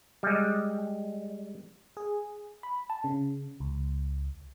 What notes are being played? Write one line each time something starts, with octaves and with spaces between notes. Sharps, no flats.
G3 G#3
G#4
B5
A5
C#3
C#2